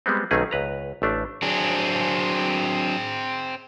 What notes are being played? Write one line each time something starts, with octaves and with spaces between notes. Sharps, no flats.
G3 G#3 B3 C4
B1 D#3 A3 C4 C#4 G#4
C#2 B4 A#5
A1 A3 D4
F#3 C4 D4 G#4